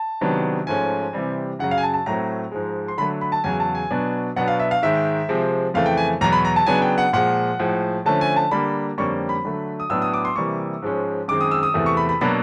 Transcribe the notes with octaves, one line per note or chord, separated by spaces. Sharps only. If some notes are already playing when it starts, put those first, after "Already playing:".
Already playing: A5
C3 D#3 F#3 B3 D4
G#2 F3 A3 C#4 G#5
C3 E3 G3 C4
F#2 C#3 F#3 F#5
F5
G#5
A5
A5
A2 F#3 A3 C4 A#5
G#2 F3 G#3
C6
D3 F#3 A3 B5
B5
A5
E2 C#3 F#3 G#5
A5
G#5
B2 F#3 B3 D4
B2 F#3 B3 D4 F#5
F5
E5
F5
G#2 D#3 G#3 E5
C3 F3 G#3 C4
F2 C#3 E3 A3 F5
G5
G#5
E2 B2 F#3 A#5
B5
A#5
A5
C#3 F#3 B3 D4 G#5
G5
F#5
A#2 F3 G#3 F#5
A2 F3 G#3
D3 F3 A3 C#4 A5
G#5
A5
D3 G3 A#3 B5
F2 D3 G3 A#3 C#4 C#6
B5
D3 F#3 A3
D#6
A2 F#3 B3 D4 E6
D#6
D6
C6
C3 E3 G3 A#3 C#6
G#2 F3 G#3 C#4
F#2 D#3 G#3 C4 D6
D#6
E6
D#6
E2 C3 E3 A3
C#6
B5
B5
B2 F#3 A#3 D4 B5